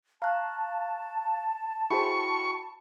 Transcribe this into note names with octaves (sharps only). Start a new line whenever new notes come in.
F5 A5 A#5 C#6 F#6
E4 F#4 G#4 C5 G5 B5 C#6